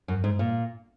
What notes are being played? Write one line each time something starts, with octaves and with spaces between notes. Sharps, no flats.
F#2
G#2
A#2